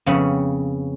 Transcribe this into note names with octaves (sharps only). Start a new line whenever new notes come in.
F2 C#3 B3 C#4